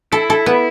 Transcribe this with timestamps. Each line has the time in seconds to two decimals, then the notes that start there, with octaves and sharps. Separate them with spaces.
0.12 E4 A4
0.30 A4
0.46 B3